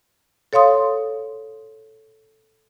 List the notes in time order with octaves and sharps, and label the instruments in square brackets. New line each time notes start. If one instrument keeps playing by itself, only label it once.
[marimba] A4 C#5 F5 C6 D#6